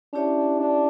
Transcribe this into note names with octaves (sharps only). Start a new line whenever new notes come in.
C#4 D4 E4 G4 C#5 E5
D4